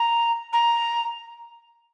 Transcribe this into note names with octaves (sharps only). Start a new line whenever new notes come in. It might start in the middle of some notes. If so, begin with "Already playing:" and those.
Already playing: A#5
A#5